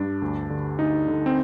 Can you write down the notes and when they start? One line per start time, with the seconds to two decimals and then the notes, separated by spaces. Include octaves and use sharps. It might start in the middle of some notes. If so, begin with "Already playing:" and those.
Already playing: G2 D4
0.22 D2
0.50 D3
0.79 D2 D#4
1.08 D3
1.26 C4